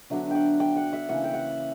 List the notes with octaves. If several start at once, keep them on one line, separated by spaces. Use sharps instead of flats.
D3 F#3 B3 D4 E5
F#5 G5
G5
F#5
E5
C#3 E3 A#3 F#5
G5
F#5